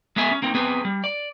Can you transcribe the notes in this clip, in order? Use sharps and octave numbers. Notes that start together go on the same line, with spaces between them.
G#3 B3 G#4 E5 G#5
C#4
A#3 C4 D#4
B3 C4 G#4 B4
G3
D5